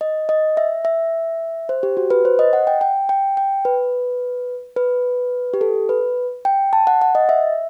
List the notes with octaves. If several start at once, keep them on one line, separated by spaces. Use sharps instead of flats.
D#5
D#5
E5
E5
C5
G4
F#4
B4
C5
D#5
F#5
G5
G5
G5
G5
B4
B4
G4
A4
B4
G5
A5
F#5
F#5
D#5
E5